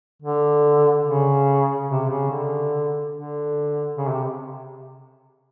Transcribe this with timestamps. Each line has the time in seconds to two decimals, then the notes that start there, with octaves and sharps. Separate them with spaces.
0.23 D3
1.05 C#3
1.89 C3
2.09 C#3
2.30 D3
3.13 D3
3.96 C#3
4.10 C3